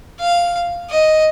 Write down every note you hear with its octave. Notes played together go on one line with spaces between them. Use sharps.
F5
D#5